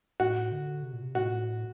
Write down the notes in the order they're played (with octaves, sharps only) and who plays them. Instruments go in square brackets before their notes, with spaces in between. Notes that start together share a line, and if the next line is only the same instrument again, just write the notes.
[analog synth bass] A2 [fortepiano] F#4
[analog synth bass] D3
C3
A#2
C3
[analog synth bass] A2 [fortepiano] F#4